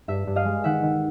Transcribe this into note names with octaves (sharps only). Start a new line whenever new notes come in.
G2 E5
G2
D#5 F5
G#3
D#3 E5 F#5
D#3